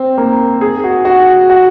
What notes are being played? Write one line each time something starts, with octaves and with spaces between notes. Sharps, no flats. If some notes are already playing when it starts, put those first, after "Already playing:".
Already playing: C4
A#3
G#4
F#4
F#4
F#4